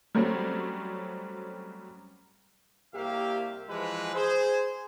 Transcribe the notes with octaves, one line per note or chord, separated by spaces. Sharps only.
F#3 G3 A3 C4 C#4
C2 A#3 G4 E5 F5
E3 F3 G#3 E4 B4
G#4 C5